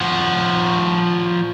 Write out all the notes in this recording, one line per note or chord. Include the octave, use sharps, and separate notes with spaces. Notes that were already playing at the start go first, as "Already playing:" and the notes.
F3 F#4